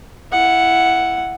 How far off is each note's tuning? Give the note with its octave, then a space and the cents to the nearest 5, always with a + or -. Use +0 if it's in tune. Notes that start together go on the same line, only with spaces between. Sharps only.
E4 +15 F#5 +0